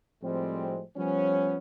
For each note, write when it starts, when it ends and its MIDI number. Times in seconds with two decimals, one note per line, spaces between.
0.23 0.82 45
0.23 0.82 53
0.23 0.82 55
0.23 0.82 56
0.23 0.82 60
0.97 1.57 53
0.97 1.57 55
0.97 1.57 59
0.97 1.57 61